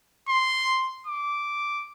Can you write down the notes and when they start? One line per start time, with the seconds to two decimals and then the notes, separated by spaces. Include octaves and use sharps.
0.29 C6
1.07 D6